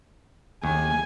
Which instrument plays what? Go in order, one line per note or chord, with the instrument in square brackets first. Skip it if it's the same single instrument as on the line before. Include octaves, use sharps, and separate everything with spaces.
[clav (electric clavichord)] D#2 [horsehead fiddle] G#5